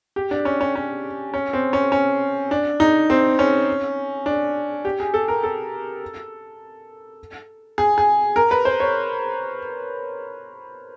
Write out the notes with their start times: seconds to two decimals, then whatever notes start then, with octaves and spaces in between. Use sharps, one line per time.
0.16 G4
0.31 D4
0.45 C#4
0.61 C#4
0.76 C#4
1.34 C#4
1.53 C4
1.73 C#4
1.92 C#4
2.51 D4
2.80 D#4
3.10 C4
3.39 C#4
4.26 D4
4.85 G4
5.00 G#4
5.14 A4
5.28 A#4
5.43 A4
7.78 G#4
7.98 G#4
8.36 A#4
8.51 B4
8.65 C5
8.80 C#5